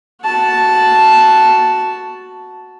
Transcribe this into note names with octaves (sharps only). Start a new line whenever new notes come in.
F#4 A5